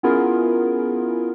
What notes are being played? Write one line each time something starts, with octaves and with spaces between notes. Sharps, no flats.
B3 C#4 E4 F4 G#4 A#4